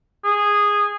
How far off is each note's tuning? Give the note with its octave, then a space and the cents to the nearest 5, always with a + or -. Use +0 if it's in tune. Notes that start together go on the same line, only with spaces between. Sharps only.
G#4 -10